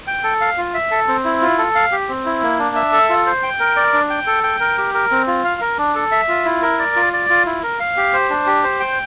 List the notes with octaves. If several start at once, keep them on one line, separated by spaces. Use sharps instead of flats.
G5
A4
F5
F4
E5
A4
C4
E4
F4
A4
F5
G4
C4
E4
A#3
D4
E5
A4
F4
C5
G5
A#4
D5
D4
G5
A4
G5
A#4
G4
A#4
C4
F4
F5
A#4
D4
A4
E5
F4
E4
A#4
D5
F4
D5
F4
E4
A#4
F5
G4
C5
D4
G4
C5
G5